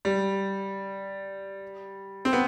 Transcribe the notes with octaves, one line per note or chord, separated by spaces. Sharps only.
G3
C4
B3